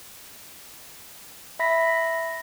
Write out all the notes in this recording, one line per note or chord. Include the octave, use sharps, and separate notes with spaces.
E5 B5 A#6 B6